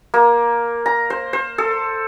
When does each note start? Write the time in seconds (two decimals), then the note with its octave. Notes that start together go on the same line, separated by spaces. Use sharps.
0.14 A#3
0.86 A#5
1.10 C5
1.33 C5
1.58 A4